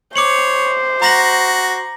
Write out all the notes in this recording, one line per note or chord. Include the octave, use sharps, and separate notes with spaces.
C5 C#5 D6 C#7 F#7
F#4 A#5 A#6 F#7